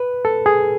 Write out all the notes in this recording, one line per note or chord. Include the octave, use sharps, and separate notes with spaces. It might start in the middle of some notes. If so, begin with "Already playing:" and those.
Already playing: B4
A4
G#4